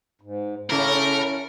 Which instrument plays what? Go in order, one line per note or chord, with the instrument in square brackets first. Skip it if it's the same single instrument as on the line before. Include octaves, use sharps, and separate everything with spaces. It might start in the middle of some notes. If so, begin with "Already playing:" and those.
[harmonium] G#2
[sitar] A2 C#3 A3 [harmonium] C#4 E4 [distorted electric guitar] A#4